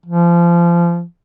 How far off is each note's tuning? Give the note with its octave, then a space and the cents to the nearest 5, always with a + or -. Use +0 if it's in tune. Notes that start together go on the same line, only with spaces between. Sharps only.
F3 -25